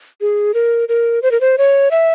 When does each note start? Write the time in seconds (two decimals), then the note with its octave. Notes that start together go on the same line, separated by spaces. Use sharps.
0.21 G#4
0.54 A#4
0.89 A#4
1.23 C5
1.31 A#4
1.41 C5
1.58 C#5
1.91 E5